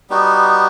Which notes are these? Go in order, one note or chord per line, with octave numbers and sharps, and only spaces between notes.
G3 B3 D#4 F#4